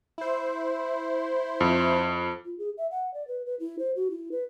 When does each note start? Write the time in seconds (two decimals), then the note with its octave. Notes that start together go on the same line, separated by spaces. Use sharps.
0.18 E4 C5
1.60 F2
2.45 F4
2.58 G#4
2.78 E5
2.91 F#5
3.14 D5
3.28 B4
3.46 B4
3.60 E4
3.79 C5
3.96 F#4
4.10 E4
4.32 B4